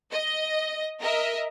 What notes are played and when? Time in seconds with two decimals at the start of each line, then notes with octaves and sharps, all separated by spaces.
0.12 D#5
1.01 A#4 D#5 E5